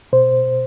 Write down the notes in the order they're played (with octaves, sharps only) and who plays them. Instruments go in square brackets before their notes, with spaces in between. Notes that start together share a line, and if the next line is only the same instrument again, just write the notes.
[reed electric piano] B2 C5